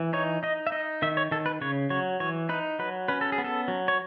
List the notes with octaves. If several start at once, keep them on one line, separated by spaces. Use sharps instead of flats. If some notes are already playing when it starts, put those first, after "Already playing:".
Already playing: E3
D#4 C#5
D#4 D#5
E5
D#4 D#5
D#3 E5
C#5
D#3 A4
B4
C#3 C#5
F#3 C#5
E3 C#5
D#4 B4
F#3 B4
C#4 B4
A4
G#4
B3
A4
F#3
C#5